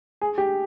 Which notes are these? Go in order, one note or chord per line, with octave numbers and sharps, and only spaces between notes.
G#4
G4